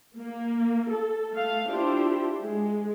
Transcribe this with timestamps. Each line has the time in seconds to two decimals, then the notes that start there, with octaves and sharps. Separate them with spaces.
0.17 A#3
0.90 A4
1.33 A3 F5
1.69 D4 E4 F4 G4 C5
2.42 G#3